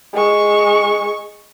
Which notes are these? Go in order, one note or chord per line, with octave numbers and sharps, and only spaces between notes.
G#3 C#6